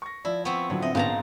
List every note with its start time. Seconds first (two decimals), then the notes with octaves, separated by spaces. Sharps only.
0.02 C#6 A#6
0.25 F3 E4 D5
0.45 B3 C4 C#6
0.70 A2 D3 F3 F#3
0.82 C4 D#5 E5
0.95 A#1 G#2 B3 C#4 F5 A5 A#5